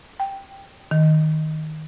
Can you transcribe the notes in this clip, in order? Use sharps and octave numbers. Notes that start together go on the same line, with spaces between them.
G5
D#3